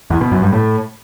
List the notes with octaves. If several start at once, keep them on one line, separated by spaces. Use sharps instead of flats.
E2
B2
F#2
G2
A2